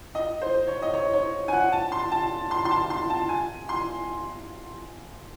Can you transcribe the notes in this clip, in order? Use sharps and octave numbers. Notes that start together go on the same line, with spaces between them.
D#5
C5
C#5
D#5
C#5
C#5
G#5
F#5
A5
C6
A5
C6
C6
A5
C6
A5
G#5
C6